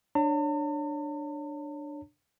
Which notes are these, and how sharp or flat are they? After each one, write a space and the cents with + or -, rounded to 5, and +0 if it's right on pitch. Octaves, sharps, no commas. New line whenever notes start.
D4 +10 C#5 +0 A5 +45